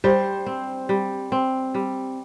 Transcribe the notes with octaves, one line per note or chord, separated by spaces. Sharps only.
G3 C5
C4
G3
C4
G3